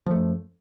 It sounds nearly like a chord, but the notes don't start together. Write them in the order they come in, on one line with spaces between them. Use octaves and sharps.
F3 A3 F#2